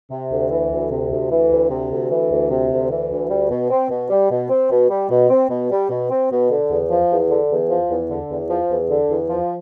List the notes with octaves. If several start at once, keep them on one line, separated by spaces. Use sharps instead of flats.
C3
D2
E3
D2
C3
D2
E3
D2
C3
D2
E3
D2
C3
D2
E3
D2
G3
B2
C4
B2
G3
B2
C4
B2
G3
B2
C4
B2
G3
B2
C4
B2
D3
E2
F3
E2
D3
E2
F3
E2
D3
E2
F3
E2
D3
E2
F3